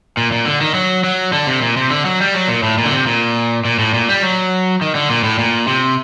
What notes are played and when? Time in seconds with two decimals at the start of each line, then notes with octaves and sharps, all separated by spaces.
0.17 A#2
0.32 A#2
0.46 D3
0.61 D#3
0.74 F#3
1.04 F#3
1.33 D3
1.47 C3
1.62 A#2
1.77 C3
1.91 D3
2.05 F#3
2.21 G3
2.35 F#3
2.49 A#2
2.63 A2
2.78 A#2
2.85 D3
2.93 C3
3.07 A#2
3.65 A#2
3.79 A2
3.94 A#2
4.09 G3
4.23 F#3
4.81 D#3
4.95 D3
5.10 A#2
5.24 A2
5.39 A#2
5.67 C3